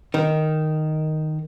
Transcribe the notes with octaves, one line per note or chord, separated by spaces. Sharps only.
D#3